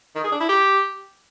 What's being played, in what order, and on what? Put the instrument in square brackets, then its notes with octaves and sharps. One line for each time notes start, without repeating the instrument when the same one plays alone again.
[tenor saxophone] D#3
G#4
D4
E4
G4